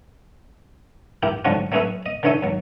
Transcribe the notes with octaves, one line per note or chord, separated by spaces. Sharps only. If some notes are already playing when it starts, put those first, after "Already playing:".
E4 G4 A#4 G5
D2 G#2 D3 F3 F#3 C#4
F#3 A3 C#4 G#4 B4 E5
D#5
D3 E3 D#4 C#5 E5 G#5
D#2 F#3